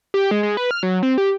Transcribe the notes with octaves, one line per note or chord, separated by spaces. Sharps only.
G4
G#3
G#3
B4
F6
F#3
C4
G4